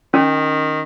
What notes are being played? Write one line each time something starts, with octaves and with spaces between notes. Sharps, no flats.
D#3 C#4